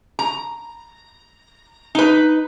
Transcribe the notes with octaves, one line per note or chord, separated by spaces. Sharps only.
A#5
D#4 B4